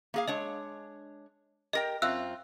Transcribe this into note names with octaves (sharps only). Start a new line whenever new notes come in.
A#3 G#4 F5
G#3 D4 C#5 D#5
G4 A#4 D#5 G5 A#6
F#2 C4 F4 E5 E6 F#6